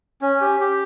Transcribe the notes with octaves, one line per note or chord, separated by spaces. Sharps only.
C#4
G4
G4